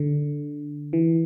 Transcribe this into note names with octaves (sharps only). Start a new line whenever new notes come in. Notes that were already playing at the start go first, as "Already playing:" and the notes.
Already playing: D3
E3